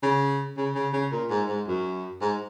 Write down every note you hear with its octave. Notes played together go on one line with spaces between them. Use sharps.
C#3
C#3
C#3
C#3
A#2
G#2
G#2
F#2
G#2